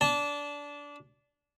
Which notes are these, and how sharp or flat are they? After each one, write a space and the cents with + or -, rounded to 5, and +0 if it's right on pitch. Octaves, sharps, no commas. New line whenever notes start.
D4 -20 A5 -15